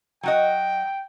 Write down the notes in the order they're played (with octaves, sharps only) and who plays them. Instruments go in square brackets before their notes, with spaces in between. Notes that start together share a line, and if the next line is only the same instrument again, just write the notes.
[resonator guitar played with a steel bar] F#3 F#4 D#5 [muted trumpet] G5